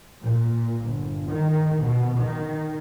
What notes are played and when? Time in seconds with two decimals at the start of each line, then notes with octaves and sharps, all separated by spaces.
0.23 A#2
0.84 G1
1.27 D#3
1.82 B2
2.18 D#3